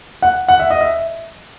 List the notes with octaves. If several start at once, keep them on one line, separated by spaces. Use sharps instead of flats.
F#5
F#5
E5
D#5
E5